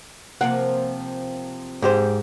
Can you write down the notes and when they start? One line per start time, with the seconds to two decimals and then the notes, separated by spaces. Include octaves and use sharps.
0.41 C3 F3 A#3 F#5
1.82 G#2 G4 C5